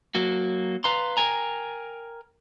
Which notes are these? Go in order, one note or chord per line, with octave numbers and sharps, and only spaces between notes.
F#3 A#3 F#4
B4 F5 A#5 C6
A#4 G5 G#5 A#5